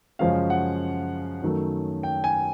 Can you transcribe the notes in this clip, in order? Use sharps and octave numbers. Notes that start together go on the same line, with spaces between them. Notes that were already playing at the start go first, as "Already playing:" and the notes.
F#2 C#3 F3 G#3 C#4 F5
F#5
F#2 D#3 F#3 A3
G5
G#5